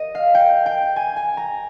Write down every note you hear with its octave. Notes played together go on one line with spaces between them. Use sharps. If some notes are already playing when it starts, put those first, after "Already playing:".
Already playing: D#5
F5
G5
G5
G#5
G#5
A#5